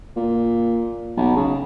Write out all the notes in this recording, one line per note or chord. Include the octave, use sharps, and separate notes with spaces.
A#2
B1
C#3